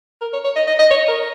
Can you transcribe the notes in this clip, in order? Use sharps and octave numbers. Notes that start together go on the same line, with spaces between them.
A#4
C#5
C#5
D#5
D#5
D#5
C#5
A#4